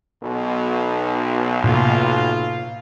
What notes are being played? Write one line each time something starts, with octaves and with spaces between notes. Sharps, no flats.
B1 B2
A2 C3 A#3 F4